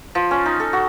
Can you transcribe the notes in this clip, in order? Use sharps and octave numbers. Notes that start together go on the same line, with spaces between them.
F3
C#4
D#4
A4
F#4